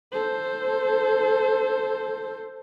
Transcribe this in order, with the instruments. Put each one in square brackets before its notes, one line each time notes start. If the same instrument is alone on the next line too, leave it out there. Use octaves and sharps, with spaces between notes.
[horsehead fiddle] A4 C5